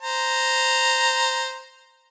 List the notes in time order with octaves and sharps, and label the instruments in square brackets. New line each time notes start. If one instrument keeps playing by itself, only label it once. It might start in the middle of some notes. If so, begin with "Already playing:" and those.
[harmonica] C5 A#5